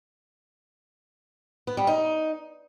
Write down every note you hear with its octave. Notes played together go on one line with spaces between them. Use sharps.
B3
G3
D#4